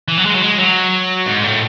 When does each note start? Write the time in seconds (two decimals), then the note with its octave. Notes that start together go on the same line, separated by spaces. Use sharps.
0.08 E3
0.17 F#3
0.25 G#3
0.35 F#3
0.43 G#3
0.59 F#3
1.26 G#2
1.44 A2